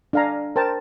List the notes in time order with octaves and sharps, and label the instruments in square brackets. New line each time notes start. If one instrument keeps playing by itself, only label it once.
[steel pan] D4 A4 F5 G#5 A#5
A#4 C5 G5 A5